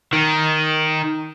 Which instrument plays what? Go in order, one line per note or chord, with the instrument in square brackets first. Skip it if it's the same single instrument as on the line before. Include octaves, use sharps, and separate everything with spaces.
[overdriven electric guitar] D#3